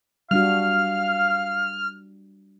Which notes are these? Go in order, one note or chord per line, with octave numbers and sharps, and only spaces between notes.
G3 D4 F#4 F5 F6